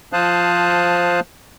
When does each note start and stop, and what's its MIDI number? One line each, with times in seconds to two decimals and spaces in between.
0.13 1.20 53
0.13 1.20 72
0.13 1.20 77
0.13 1.20 81
0.13 1.20 87
0.13 1.20 90